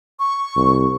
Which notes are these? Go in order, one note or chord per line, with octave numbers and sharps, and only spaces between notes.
C#6
C2